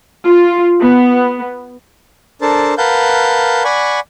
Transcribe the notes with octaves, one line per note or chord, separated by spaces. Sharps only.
F4
B3
D4 A4 A#4 C5 A5
A#4 B4 F5 F#5 A5 G6
D5 F#5 G#5 B5 C#6